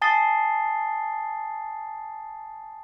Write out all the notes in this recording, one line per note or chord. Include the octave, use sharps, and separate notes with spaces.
G#5 A5 D#6 A6 C7 G7